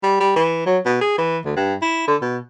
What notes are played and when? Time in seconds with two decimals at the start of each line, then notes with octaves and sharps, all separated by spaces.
0.03 G3
0.20 G3
0.36 E3
0.66 F#3
0.86 B2
1.01 G#4
1.18 E3
1.45 D2
1.56 G2
1.82 E4
2.08 D3
2.22 B2